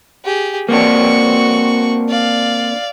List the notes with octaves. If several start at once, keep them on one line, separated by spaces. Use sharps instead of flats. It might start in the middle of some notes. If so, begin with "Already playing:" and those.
G4 G#4
A#3 C4 D4 F#4 C#6
D5 F5